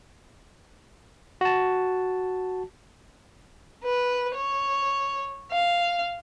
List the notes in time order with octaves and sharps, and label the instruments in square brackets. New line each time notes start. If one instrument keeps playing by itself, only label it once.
[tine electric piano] F#4 A5
[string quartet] B4
C#5
F5